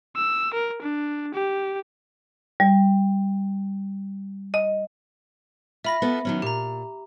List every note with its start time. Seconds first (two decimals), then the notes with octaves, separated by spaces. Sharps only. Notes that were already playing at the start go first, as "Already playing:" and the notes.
0.16 E6
0.54 A#4
0.82 D4
1.34 G4
2.60 G3
4.54 D#5
5.84 F4 E5 B5 A#6
6.02 B3 F4 A4
6.25 D#3 F#3 C#4
6.42 A#2 G4 A#5